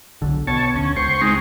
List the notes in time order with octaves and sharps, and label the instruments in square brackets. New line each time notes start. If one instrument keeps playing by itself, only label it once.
[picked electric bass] B1 D3
[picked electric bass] B2 [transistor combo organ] C#5 A5
[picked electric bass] D2 [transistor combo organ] C#4
[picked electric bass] C#2 [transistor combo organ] C5 C#6
[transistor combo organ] G#3 C4 D#4